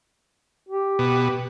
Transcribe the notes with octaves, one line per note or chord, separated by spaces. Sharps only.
G4
B2